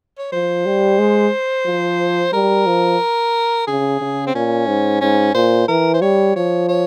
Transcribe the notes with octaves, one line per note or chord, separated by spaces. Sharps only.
C#5
F3 C5
G3
G#3
F3
G3 A#4
F3
C#3 G#4
C#3
C4
A#2 C#4
G#2
G#2 C#4
A#2 C5
E3 A#4
C5
G3 C#5
F3 C#5
C#5